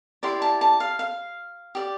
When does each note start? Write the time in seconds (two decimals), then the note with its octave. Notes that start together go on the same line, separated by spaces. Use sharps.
0.23 E4 G4 D5 C6
0.42 A5
0.61 A5
0.80 F5
0.99 F5
1.75 G4 D5